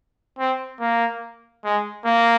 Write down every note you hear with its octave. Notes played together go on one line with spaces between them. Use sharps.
C4
A#3
G#3
A#3